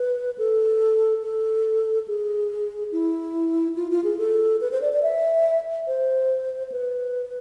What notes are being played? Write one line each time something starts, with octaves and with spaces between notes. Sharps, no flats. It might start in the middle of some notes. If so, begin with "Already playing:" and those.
Already playing: B4
A4
A4
G#4
E4
F4
F4
G#4
A4
B4
C5
D5
D5
E5
C5
B4